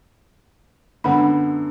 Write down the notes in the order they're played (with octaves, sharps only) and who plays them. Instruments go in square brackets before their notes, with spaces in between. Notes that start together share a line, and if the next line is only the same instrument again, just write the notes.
[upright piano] F#2 D3 B3 [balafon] G#3 F#5 B5